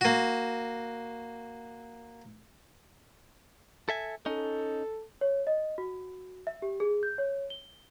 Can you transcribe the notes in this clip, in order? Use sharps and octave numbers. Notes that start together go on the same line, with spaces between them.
A#3 F#4
A4 E5 G#5
C#4 D#4 A4
C#5
D#5
F#4
E5
G4
G#4
G6
C#5
G7